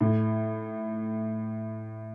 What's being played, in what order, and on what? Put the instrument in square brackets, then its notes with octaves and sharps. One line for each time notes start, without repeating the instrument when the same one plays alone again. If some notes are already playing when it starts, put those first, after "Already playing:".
[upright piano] A2